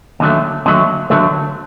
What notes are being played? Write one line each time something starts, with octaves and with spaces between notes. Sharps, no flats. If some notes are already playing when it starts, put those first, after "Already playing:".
D#2 D3 F#3 A3
D#2 D3 F#3 A3
D#2 D3 F#3 A3